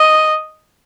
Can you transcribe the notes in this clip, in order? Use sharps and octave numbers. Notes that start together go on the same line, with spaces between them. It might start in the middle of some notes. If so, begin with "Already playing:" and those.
Already playing: D#5